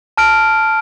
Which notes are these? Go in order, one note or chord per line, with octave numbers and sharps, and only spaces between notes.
A5 F6 D7